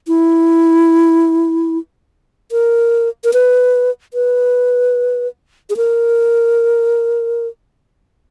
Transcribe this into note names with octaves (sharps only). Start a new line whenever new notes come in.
E4
A#4
A#4
B4
B4
G#4
A#4